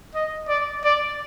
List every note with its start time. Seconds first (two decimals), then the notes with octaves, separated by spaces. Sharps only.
0.15 D#5
0.48 D5
0.84 D5